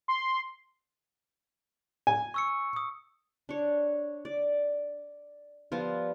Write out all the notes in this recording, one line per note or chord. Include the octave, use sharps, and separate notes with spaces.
C6
G#5
C#6 E6 C#7
D#6
D4 C#5
D5
F3 G3 B3 F4